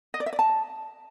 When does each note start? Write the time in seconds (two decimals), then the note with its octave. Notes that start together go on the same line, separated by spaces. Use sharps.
0.14 D#5
0.20 D5
0.26 E5
0.33 D5
0.39 A5